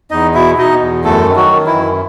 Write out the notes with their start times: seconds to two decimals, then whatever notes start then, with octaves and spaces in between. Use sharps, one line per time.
0.11 E2 D#4 D#5
0.34 B2 E4 E5
0.58 B2 D#4 D#5
0.81 E2
1.04 F#2 A3 A4
1.28 D#3
1.36 F#3 F#4
1.52 D#3
1.67 E3 E4
1.74 F#2